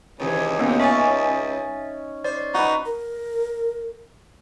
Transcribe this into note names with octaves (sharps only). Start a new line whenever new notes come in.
C#2 C3 D#3 E3
A2 C3 D#3 A#3 B3 C#4
C#4 D#4 E5 G#5 A6
C5 D5
D#4 F#4 B4
A#4